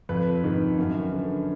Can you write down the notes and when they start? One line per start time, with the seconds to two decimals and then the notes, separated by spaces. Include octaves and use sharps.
0.09 F2 B4
0.44 D#3
0.78 F#2
1.13 D3